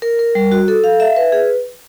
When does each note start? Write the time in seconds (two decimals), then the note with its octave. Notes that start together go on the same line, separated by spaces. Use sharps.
0.02 A#4
0.19 A#4
0.35 G3
0.52 F#4
0.68 A4
0.84 F5
1.00 E5
1.16 B4
1.32 G#4